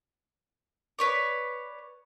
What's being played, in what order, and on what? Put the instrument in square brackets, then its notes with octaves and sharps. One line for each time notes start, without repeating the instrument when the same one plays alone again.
[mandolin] B4 C#5 D5